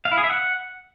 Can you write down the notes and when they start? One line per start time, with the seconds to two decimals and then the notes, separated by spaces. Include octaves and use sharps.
0.05 F5
0.11 E4
0.18 G#4
0.24 E5
0.30 F#5